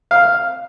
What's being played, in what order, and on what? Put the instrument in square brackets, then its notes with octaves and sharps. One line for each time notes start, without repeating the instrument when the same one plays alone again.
[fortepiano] F5